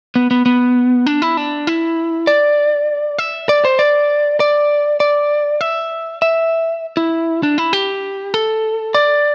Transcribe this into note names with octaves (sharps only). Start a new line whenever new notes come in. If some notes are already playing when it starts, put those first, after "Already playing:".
B3
B3
B3
D4
E4
D4
E4
D5
E5
D5
C5
D5
D5
D5
E5
E5
E4
D4
E4
G4
A4
D5